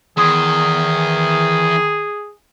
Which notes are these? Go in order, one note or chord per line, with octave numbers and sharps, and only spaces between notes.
E2 D#3 G#4 C6 D#6 G#6